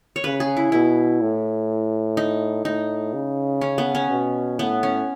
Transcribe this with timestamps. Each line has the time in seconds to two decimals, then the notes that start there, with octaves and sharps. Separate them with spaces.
0.16 C#5
0.24 C#3 B4
0.40 G#4
0.57 E4
0.72 B2 E4
1.21 A2
2.17 D#4
2.65 A2 D#4
3.14 C#3
3.61 C#4
3.78 B3
3.95 C#4
4.10 B2
4.59 A2 B3
4.83 C#4